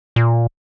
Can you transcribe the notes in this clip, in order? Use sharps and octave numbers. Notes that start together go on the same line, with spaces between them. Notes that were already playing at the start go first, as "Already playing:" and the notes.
A#2